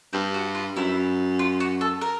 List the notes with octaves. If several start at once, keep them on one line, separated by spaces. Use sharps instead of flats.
G2 C4
F#4
F4
F#2 E4
F4
F#4
A4
A#4